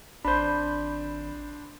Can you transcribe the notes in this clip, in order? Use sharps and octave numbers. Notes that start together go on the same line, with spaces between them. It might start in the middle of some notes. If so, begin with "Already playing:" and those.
G#1 D4 C5 B5 G6